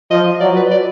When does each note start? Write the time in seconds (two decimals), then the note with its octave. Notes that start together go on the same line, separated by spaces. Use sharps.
0.11 F3 D#5
0.41 F#3 D5
0.56 B4
0.71 D5